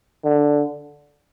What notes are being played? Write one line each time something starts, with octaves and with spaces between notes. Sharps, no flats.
D3